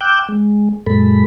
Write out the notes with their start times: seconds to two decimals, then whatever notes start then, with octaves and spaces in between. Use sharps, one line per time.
0.01 G5 D6 E6 F#6 G6
0.29 G#3
0.87 F#2 A#2 G#3 A4 B5